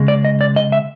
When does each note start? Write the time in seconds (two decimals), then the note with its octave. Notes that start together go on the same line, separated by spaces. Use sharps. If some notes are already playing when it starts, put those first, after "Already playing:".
Already playing: C#3 G#3
0.08 D5
0.25 D#5
0.41 D5
0.56 D#5
0.72 E5